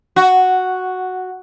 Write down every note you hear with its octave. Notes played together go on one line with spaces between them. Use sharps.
F#4